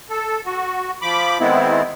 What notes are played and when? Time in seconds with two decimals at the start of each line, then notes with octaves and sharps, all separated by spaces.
0.10 A4
0.46 F#4
1.02 F3 B5 D6
1.40 D#3 G#3 B3 C4 E4